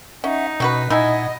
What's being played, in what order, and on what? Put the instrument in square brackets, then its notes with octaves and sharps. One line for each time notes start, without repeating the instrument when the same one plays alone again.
[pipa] C#4 [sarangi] D#4 [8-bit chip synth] E5 F#5
[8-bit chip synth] B2 [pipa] C#4 F#4 B4
[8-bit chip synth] A#2 F#5 [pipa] D#4 E4 G#5 [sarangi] D#5